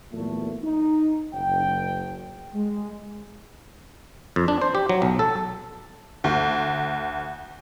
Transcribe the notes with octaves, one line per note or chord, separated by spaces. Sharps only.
E2 A#2 F#3 A3
D#4
F#1 G5
G#3
F2
D4
C5
G4
F#3
B1
A4
D2